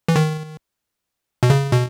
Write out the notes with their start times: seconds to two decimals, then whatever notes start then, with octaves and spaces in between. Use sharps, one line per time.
0.08 E3
0.16 D#3
1.43 B2
1.50 C#3
1.72 B2